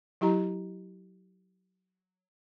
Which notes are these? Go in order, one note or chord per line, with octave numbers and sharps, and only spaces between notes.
F#3 E4 G4 D#5 A#5